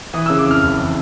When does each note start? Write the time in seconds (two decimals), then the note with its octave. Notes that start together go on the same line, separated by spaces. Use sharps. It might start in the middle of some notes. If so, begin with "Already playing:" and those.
0.14 E3 D#6
0.26 C#3 E6
0.38 D6
0.47 F2 F6
0.63 F#1
0.79 E3